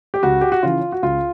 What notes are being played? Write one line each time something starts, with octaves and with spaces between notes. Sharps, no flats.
G4
C#2 F#4
G4
F#4
C#3 E3 F4
F#4
C#2 F4